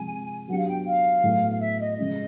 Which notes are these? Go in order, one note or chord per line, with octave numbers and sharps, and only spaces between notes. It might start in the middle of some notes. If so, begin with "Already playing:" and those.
Already playing: C3 F3 G#3 G#5
F#3 B3 D4 G4 F#5
F5
G5
F5
A2 F#3 B3
F5
E5
D#5
C#3 F3 G#3 C#4 D#5